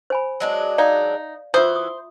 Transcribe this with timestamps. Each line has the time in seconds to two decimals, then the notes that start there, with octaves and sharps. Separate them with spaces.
0.10 C5 G#5 B5
0.40 F#3 G#3 D4
0.78 D#4 D5 F5
1.54 E3 F4 F#4 C5 E5 D#6
1.76 D#6